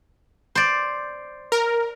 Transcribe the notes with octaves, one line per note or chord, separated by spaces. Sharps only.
C5 D5
A#4